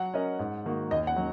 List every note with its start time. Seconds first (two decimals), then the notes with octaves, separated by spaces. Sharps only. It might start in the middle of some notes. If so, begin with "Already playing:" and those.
Already playing: F#3 F#5
0.14 C#4 A#4 D#5
0.39 G#2
0.66 D#3 A#3 F#4
0.91 D#2 D#5
1.07 F#5
1.16 D#3 F#3 C#4